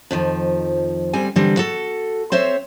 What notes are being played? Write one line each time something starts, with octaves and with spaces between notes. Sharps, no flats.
F2 D#3 F3
D2 G3 C4 G#5
D3 E3 G3 C4
F#4 A4
C4 C5 C#5 E5